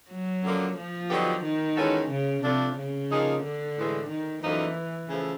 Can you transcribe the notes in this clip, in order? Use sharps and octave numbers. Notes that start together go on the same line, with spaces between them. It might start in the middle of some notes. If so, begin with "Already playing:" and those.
F#3
F#2 D3 F3 A#3
F3
D3 F#3 B3 D#4 G4
D#3
E3 G#3 C#4 F#4 A4
C#3
C3 F3 A3 D4 F4 A4
C#3
F3 A#3 D#4 G#4
D3
A2 E3 G#3
D#3
F#2 D3 E3 F3 A#3 D#4
C#3 F3 A3